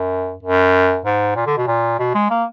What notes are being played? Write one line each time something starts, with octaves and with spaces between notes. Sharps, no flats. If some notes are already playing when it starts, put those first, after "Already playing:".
Already playing: F#2
F#2
G#2
A#2
D3
B2
A#2
B2
G#3
A#3